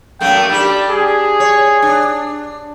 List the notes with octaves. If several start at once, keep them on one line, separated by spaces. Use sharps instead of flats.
F#2 A3 A#3 G5
G3 D4 G4
G#4
C#5
D4